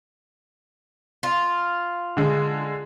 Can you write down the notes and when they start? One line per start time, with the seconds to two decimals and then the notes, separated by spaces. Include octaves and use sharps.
1.23 F4
2.17 D3 G#3